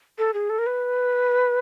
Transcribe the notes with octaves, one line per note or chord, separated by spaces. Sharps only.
A4
G#4
A4
A#4
B4